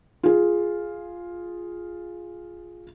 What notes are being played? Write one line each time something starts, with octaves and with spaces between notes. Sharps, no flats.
F4 G#4